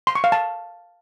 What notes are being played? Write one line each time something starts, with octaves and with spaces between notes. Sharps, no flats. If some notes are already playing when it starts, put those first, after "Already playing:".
C6
C#6
F5
A5